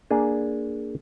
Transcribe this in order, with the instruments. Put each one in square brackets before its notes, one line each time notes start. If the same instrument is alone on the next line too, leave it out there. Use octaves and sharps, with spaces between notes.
[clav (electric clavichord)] A#3 D4 G#4